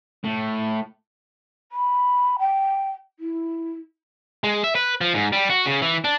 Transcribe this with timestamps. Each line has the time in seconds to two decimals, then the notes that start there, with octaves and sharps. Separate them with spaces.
0.24 A2
1.72 B5
2.39 G5
3.20 E4
4.44 G#3
4.64 E5
4.75 B4
5.01 F3
5.14 G#2
5.33 G3
5.50 F#4
5.66 C#3
5.82 E3
6.04 D4